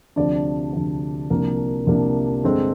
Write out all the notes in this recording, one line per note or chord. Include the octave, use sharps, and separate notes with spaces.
D2 C3 F3 D4 D5
D2 C3 F3
C2 C3 F3 A#3 D4 A#4
C2 C3 F3 A#3 D4
G2 D3 G#3 C4